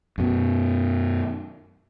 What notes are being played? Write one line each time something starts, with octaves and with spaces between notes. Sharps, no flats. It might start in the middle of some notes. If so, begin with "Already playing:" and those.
F#2 B2